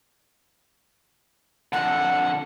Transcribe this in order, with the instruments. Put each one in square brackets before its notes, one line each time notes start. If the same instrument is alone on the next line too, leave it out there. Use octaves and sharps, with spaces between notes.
[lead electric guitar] F2 D3 [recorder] F#5